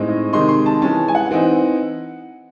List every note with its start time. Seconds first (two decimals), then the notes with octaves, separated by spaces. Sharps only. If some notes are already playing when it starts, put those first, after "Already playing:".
Already playing: A2 G#3 C4 D#4
0.08 D#5
0.33 C3 D#3 G#3 D#4 C6
0.49 C6
0.66 A5
0.82 E3 G#3 C#4 A5
1.08 G#5
1.15 F#5
1.31 E3 C4 D#4